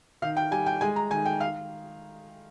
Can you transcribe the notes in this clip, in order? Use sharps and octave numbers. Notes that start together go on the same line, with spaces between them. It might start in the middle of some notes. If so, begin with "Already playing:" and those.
D#3 F5
G5
G3 G#5
G5
G#3 G#5
A#5
D#3 G#5
G5
F5